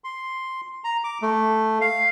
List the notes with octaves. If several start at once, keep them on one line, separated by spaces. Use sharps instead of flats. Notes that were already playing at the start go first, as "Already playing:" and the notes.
C6
A#5
D6
A3
F5